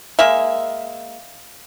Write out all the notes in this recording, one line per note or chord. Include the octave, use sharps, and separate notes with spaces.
G#3 A#3 E5